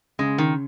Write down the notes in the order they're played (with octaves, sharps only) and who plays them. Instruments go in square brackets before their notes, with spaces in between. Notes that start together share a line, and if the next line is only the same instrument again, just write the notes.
[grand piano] C#3 [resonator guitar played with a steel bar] G#3
[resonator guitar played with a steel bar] D#3